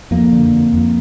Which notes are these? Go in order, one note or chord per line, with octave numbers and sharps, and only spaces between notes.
F2 A#3
D3
F2
F2